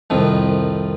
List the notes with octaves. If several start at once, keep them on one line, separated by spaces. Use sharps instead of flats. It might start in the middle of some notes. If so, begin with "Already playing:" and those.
C2 F2 D#3 F3